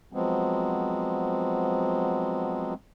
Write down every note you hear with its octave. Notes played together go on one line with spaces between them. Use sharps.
F3 F#3 G#3 B3 C4